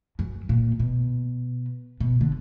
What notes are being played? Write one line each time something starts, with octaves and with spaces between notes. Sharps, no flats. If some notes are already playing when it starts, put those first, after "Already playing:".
F#2
A#2
B2
B2
D3